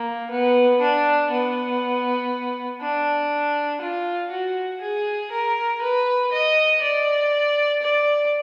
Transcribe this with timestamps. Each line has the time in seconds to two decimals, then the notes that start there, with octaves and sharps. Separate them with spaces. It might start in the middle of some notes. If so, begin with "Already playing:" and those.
Already playing: A#3
0.31 B3
0.81 D4
1.31 B3
2.81 D4
3.81 F4
4.31 F#4
4.81 G#4
5.31 A#4
5.82 B4
6.32 D#5
6.82 D5
7.82 D5